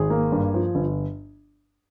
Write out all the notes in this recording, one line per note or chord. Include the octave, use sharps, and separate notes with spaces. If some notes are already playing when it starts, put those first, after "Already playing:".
Already playing: G#1 G#4
A#3
G2
F3
G1